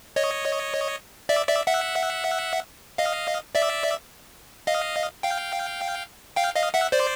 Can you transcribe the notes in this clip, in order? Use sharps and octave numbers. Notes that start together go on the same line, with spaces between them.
C#5 D#5
D5 E5
D5 E5
E5 F#5
D#5 F5
D5 E5
D#5 F5
F5 G5
F5 G5
D#5 F5
E5 F#5
C5 D5